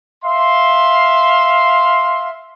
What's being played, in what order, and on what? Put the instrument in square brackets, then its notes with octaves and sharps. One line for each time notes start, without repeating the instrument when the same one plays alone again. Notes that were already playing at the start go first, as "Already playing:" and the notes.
[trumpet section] E5 F5 C6